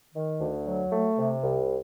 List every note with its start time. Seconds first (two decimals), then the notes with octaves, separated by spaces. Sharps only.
0.15 D#3
0.40 D2
0.66 F#3
0.91 A3
1.17 C3
1.42 C2